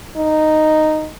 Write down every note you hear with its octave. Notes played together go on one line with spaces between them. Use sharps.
D#4